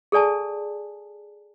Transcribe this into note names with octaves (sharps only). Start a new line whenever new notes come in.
G#4 A4 D5 G#5 A5